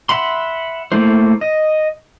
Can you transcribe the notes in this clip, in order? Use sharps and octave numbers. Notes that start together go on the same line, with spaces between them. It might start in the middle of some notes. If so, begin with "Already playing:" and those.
E5 F#5 B5 C6
A3 A#3 E4 C5
D#5